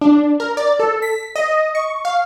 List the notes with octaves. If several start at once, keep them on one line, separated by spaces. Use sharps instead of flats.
D4
A#4
D5
A4
B6
D#5
C#6
F5